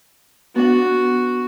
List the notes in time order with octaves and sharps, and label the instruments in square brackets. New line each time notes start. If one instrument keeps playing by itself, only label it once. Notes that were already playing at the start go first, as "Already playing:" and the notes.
[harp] B3 D4 F#5 [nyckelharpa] F#4